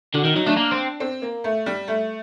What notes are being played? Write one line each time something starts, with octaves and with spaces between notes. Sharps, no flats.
D3 F#4
D#3 D#4
F#3 D#4
A3 D4
A#3
C4
C4
A#3
A3
G3
A3